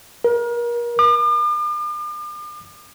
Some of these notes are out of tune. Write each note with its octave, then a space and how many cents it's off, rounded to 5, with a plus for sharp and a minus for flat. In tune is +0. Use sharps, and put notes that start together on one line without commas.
A#4 +35
D6 +45